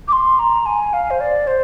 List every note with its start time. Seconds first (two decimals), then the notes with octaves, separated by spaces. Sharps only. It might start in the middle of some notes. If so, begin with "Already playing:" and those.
0.08 D6
0.12 C6
0.39 A#5
0.66 G#5
0.93 F5
1.10 C5
1.20 D5
1.47 C5